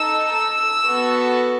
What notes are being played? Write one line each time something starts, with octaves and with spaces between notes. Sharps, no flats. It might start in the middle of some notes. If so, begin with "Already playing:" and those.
Already playing: D#4 A4 E6
E6
B3 F#4 A4